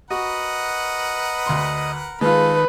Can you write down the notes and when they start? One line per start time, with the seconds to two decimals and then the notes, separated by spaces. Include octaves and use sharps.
0.11 F#4 A#4 B4 D#5 F#5
1.46 D2 C6
2.21 D#3 G#3 F4 A4 B4